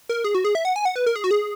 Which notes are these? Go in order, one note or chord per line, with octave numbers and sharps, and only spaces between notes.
A#4
G#4
F#4
G#4
E5
F#5
G#5
F#5
B4
A#4
G#4
F#4
G#4